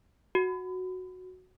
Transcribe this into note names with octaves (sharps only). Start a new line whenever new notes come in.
F#4